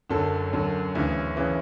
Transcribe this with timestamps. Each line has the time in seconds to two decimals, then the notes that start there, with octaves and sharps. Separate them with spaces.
0.10 F#1 F#2 D3 A4
0.53 F#1 F#2 D3
0.95 D2 C#3 E3
1.36 C#3 E3